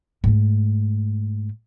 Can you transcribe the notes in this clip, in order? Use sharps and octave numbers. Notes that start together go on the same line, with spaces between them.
G#2 A3